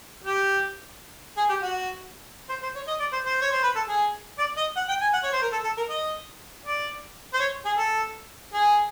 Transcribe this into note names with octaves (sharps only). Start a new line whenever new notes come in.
G4
G#4
G4
F#4
C5
C5
C#5
D#5
D5
C5
C5
C#5
C5
B4
A4
G#4
D5
D#5
F#5
G5
G#5
F#5
C#5
C5
A#4
A4
A4
A#4
D#5
D5
C5
C#5
G#4
A4
G#4